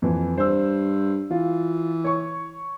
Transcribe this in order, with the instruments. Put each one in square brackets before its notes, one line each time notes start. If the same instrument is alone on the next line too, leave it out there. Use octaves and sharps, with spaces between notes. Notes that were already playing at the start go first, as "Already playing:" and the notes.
[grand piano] F2 E3
[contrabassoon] G2 [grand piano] C5 E6
[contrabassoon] E3 [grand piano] F4
[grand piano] C#5 C#6